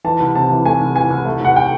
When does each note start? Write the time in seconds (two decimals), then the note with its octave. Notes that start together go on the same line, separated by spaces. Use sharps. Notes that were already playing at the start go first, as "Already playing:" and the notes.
0.04 E3 A5
0.20 C2
0.35 C3 A5
0.50 E3
0.65 A3 G#5
0.81 C2
0.95 E3 G#5
1.10 C2
1.25 A3
1.40 C2 F#5
1.56 G5